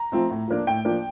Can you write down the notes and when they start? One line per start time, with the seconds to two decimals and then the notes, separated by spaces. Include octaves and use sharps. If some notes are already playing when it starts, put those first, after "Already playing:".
Already playing: A#5
0.12 F3 A3 C4 F4
0.30 A2
0.48 F3 A#3 D4
0.67 A2 G5
0.85 F3 A#3 D4